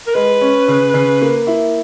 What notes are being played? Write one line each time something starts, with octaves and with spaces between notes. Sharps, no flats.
A#4
G#3 B4
C#4
C#3
C#3
A#3
E4